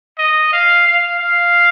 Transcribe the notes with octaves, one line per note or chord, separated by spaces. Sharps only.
D#5
F5
F5
F5